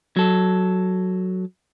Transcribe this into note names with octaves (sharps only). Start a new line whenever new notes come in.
F#3 A4